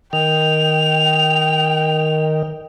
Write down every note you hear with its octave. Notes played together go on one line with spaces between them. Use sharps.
D#3 G5 F7